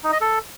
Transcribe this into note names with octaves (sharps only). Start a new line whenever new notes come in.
D#4
D#5
A4